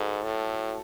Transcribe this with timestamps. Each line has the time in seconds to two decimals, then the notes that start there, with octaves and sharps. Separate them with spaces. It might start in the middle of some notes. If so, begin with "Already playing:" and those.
Already playing: G#2 F#4 A4
0.23 A2